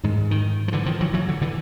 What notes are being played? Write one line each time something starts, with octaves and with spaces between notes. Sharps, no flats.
G#2 D#3
D#3
F3
D3 E3
D#3 F3
E3 F#3
E3 F#3
D3
D3 E3